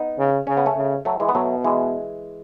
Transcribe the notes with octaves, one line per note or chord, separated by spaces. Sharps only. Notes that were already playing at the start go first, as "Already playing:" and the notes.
Already playing: B3 D#4
C#3
C#3 C#4
B3
A3 C#4
C#3
F#3 A3
E3 G#3
B3
B2 F#3 A3
E3 G#3